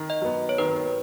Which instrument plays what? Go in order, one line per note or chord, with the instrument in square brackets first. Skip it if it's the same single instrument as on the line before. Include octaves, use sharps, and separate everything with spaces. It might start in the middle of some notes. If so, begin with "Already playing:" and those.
Already playing: [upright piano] D#3
[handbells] D#5
[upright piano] F#3 B3
[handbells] C#5
[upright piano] D#3 [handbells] B4